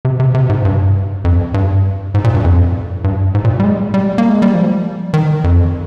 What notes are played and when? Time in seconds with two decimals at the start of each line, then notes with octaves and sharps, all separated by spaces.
0.05 C3
0.20 C3
0.34 C3
0.49 G#2
0.65 G2
1.24 F2
1.54 G2
2.14 G#2
2.24 A#2
2.35 G2
2.44 F2
3.04 G2
3.35 G#2
3.45 A#2
3.60 G3
3.64 G#3
3.94 G3
4.18 A#3
4.30 G#3
4.42 G3
4.54 F3
5.14 D#3
5.44 F2